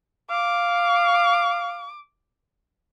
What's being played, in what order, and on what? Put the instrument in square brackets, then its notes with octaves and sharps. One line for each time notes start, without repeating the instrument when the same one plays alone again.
[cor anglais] F5 [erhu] D6